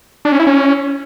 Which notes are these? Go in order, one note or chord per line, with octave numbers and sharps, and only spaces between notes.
D4
C#4
E4
C#4